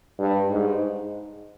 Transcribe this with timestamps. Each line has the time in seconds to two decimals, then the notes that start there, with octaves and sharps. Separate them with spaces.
0.19 G2
0.50 G#2